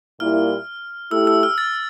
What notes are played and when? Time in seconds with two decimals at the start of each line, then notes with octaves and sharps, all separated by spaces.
0.20 A#2 G3 A#3 E4 F6
1.11 A3 E4 G4 E6
1.27 E6
1.43 F6
1.58 A6